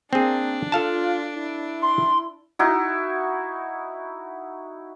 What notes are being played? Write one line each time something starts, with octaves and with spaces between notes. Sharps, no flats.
A#3 C4 D4 G#4
F4 A4 F5 A5
E4
C6
D#4 E4 F#4